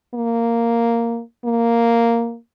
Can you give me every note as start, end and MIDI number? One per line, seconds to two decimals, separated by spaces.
0.14 1.20 58
1.45 2.36 58